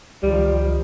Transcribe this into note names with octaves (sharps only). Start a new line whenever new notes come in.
C#2 D#3 F3 G3